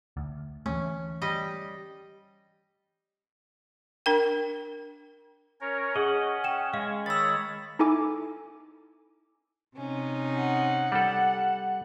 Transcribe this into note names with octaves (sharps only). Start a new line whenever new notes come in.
D2
E3 A3 C#4
G3 D#5
D4 A#4 G5
C#4 A#4 C#5
C#4 G#4 D#5 F#5
G5 E7
G#3 F5
D#3 C#5 B5 E6 A6
D#4 E4 A4 G#5 D6
C3 C#4 D#4
F#5
G3 A4